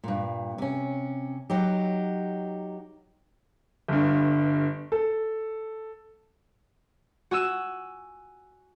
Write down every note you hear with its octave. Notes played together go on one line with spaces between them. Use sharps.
G2 A#2
C3 C#4
F#3 D#4 G4
G1 G2
A4
F#4 G#5 E6 E7